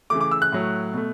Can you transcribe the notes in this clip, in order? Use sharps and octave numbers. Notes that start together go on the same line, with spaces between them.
C#3 E3 A3 D6
D6
E6
F#6
A2 F#3 A3
B2 A3